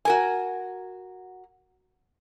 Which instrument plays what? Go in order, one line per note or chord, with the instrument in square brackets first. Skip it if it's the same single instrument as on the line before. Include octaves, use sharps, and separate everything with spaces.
[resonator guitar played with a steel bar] F#4 A#4 G#5